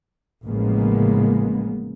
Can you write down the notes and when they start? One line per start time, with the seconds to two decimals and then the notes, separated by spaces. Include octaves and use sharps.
0.45 A1 C#3 F3 G#3 A#3 B3